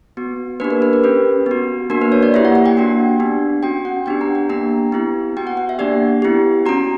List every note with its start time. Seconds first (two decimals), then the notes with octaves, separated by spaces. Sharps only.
0.17 B3 F#4
0.60 A#3 D4 G4 B4
0.71 A#4
0.82 B4
0.93 A#4
1.03 C#4 G4 B4
1.46 B3 F#4
1.90 A#3 D4 F#4 A#4
2.02 B4
2.12 C#5
2.23 D5
2.34 A#3 E4 G4 E5
2.45 F#5
2.55 F#5
2.66 G5
2.77 A#3 D4 F#4
3.20 B3 D4 G4
3.63 C#4 F#4 G5
3.85 F#5
4.06 B3 D4 G4 G5
4.21 A#5
4.35 G5
4.49 A#3 D4 G4 A#5
4.92 B3 E4 G4
5.37 B3 F#4 G5
5.47 F#5
5.57 F#5
5.69 E5
5.79 A#3 D4 G4 D5
6.22 B3 E4 G4
6.66 C#4 F#4 A#5